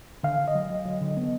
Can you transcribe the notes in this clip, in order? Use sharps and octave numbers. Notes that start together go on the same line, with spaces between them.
D3 F5
D3
D#5
F#3
F#3
F#3
D3
B3